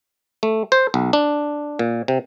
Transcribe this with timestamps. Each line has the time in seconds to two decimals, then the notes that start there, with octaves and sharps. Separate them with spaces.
0.43 A3
0.72 C5
0.94 B1
1.13 D4
1.79 A#2
2.08 C3